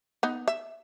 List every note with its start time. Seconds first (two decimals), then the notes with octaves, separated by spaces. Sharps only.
0.23 B3 D#4
0.48 E5